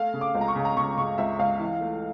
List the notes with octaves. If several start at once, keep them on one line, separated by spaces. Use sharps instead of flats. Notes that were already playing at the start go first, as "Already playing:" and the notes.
Already playing: A3 F5
C#3
D6
C#2
A#5
C#6
C#3
A#5
C#3 C#6
C#3 C#6
C#2 E5
C#2 F5
E3
A3